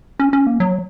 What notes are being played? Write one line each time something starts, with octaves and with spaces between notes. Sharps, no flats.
C#4
C#4
A#3
F#3